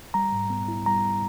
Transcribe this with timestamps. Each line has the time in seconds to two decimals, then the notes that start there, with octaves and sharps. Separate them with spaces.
0.14 G3 A#5
0.32 G#2
0.50 B3
0.68 E4
0.86 G3 A#5